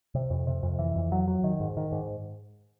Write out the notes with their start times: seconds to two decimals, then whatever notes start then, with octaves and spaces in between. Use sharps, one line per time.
0.15 C3
0.30 F2
0.47 C3
0.63 F2
0.79 E3
0.95 F2
1.12 F#3
1.28 F#3
1.44 D#3
1.60 G#2
1.77 D#3
1.92 G#2